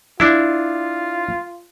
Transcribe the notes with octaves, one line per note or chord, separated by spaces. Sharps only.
D4 E4 F4